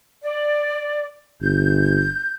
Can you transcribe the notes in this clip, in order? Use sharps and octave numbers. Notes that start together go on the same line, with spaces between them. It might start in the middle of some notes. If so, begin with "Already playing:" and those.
D5
G1 G6